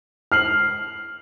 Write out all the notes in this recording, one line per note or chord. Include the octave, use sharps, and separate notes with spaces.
F6 C7 F#7